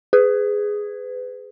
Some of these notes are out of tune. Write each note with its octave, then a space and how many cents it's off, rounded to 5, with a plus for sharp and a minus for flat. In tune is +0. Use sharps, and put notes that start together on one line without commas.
G#4 +0 B4 +30